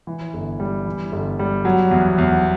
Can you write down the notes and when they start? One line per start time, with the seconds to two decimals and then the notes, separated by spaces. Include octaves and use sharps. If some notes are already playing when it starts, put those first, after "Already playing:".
0.07 E3
0.34 G1
0.60 G3
0.86 E3
1.12 G1
1.39 G3
1.65 F#3
1.91 E2
2.18 E2